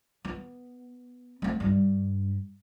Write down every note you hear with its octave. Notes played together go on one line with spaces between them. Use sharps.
B3
A3 C4
G2 G3